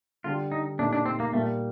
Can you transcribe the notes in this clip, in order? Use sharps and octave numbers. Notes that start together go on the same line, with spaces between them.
D3 G3 D4 F4 G4
D#4
A#2 A3 D4 D#4 G4
D4
C4
A#3
A#2 G3 A3 A#3